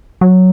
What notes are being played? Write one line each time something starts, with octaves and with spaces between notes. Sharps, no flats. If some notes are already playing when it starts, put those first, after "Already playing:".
F#3